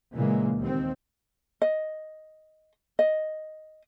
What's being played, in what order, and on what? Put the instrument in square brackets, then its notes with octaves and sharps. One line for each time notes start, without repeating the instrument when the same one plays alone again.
[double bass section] A#2 C#3 E3 G#3 A#3
D#2 C4
[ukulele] D#5
D#5